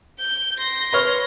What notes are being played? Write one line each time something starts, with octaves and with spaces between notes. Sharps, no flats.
G6
C6 A#6
B4 C#5 F6